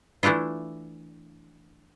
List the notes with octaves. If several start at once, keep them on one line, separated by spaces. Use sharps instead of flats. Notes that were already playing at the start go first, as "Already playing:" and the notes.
E3 A3 D4 E4 F4